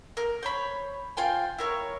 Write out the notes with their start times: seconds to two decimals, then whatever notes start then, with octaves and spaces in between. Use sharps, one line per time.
0.17 A#4
0.43 C5 C#5 B5
1.17 F4 C5 G5 G#5
1.58 E4 A#4 C#5